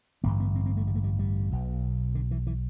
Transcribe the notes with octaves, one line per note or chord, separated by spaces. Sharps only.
A1 G2 D3 B3
B3
C4
C4
A3
G3
A3
G3
G3
B1 B2
D3
E3
E3